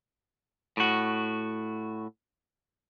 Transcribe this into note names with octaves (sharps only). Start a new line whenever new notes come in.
A2 F#4